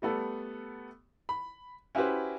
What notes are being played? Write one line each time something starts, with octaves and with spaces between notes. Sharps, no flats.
G3 A3 B3 A4
B5
C#4 E4 F#4 G4 B4 C5